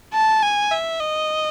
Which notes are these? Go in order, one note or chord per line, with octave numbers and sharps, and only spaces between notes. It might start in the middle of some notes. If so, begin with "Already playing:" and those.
A5
G#5
E5
D#5